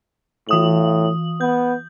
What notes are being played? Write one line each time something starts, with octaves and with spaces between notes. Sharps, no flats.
A2 E3 D#6 F#7
B3 G6